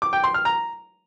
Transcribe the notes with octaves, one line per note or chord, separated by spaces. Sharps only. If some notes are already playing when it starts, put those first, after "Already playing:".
D6
G5
C6
F6
A#5